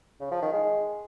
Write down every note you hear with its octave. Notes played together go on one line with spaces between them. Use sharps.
C#3
F3
D#3
G#3